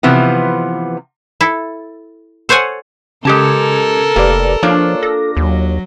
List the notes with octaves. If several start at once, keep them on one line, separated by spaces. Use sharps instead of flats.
C3 E3 F3 B3
E4 A4
A4 C5 C#5 F#5 G#5
C#3 G#3 G4 A4 A#4 A5 G#6 C#7
F1 A#3 G4 B4 D5
F3 A#3 D4 F4 C#5
A4 A#6
D#2 F#3